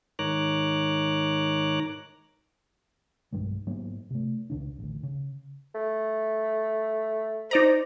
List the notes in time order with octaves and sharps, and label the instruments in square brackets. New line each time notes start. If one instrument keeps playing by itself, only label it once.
[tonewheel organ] G#2 D#3 C#5 A#5 D6 F#6
[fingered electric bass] B1 G2 F#3 G#3
G#2 F#3 A#3 B3
C3 A3
C#2 C#3 D4
A1 D2
C#3
[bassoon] A3
[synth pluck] D#4 D5 A#5 [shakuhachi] C5